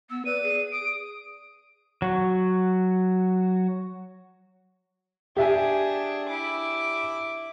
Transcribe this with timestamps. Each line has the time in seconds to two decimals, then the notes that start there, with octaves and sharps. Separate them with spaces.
0.10 B3 E6
0.25 B4 D5 D#7
0.43 G#4
0.72 D#6 D7
2.02 F#3 F#4
5.37 D4 G4 G#4 E5 G#5
6.28 E4 D6